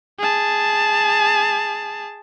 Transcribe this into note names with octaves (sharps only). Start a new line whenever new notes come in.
G#4 A5